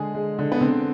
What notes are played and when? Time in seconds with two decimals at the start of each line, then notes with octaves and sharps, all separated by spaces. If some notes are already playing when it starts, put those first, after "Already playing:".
Already playing: D3 G#3 G#4
0.15 G#3
0.39 D3
0.52 B3
0.61 D3 C4